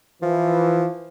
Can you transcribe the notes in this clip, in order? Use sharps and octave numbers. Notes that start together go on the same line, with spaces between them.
E3 F3